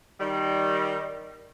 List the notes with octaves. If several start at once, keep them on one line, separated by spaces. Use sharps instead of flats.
D#3 G3